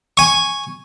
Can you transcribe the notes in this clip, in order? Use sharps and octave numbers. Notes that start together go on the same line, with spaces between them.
G#5 C#6